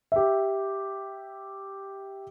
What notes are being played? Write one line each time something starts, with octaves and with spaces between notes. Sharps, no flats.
G4 E5